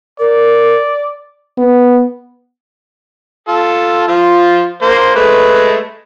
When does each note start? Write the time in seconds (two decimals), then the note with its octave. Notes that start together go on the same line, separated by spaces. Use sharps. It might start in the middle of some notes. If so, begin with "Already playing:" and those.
0.19 A#4 D5
1.58 B3
3.48 F4 A4
4.08 F3 F4
4.82 A#3 C5
5.15 G#3 A3 B4